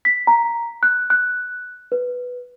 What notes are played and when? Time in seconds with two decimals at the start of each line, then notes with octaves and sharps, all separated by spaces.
0.05 B6
0.27 A#5
0.83 F#6
1.10 F#6
1.92 B4